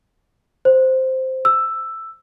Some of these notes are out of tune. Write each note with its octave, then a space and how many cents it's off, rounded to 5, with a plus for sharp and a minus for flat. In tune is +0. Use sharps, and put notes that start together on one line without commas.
C5 -5
E6 +5